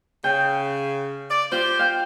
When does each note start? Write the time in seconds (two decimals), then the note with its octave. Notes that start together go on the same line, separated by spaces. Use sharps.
0.24 C#3 G5
1.31 D5
1.52 F4 G4 C5
1.79 F5 G5